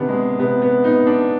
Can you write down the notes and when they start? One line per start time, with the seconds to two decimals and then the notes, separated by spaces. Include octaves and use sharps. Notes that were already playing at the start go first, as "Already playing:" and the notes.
Already playing: C3 D#3 B3 D4
0.09 G#3
0.39 C3 B3
0.62 B3
0.84 B3 D#4
1.07 D4